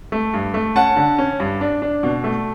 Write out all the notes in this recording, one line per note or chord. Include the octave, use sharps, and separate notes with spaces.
A3
G2
A3
C#4 F#5 A5
D3
C#4
G2
D4
D4
B2
A3